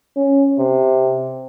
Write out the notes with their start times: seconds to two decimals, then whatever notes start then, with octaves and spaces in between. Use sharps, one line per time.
0.16 C#4
0.59 C3